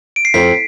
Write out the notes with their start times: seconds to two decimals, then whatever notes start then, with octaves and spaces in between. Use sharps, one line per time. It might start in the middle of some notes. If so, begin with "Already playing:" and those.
0.16 D7
0.25 C7
0.34 F2 B6